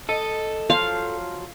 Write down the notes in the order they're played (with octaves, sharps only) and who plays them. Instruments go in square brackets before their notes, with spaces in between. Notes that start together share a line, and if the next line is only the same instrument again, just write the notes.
[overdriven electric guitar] A4 [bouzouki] D#5
[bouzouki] F3 F#3 [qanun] F5